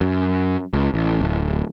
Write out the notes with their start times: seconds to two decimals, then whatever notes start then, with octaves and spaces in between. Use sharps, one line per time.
0.01 F#2
0.73 C#2
0.94 A1
1.21 D1